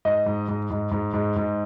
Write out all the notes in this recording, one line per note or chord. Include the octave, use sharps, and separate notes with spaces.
G#2 D#5
G#2
G#2
G#2
G#2
G#2
G#2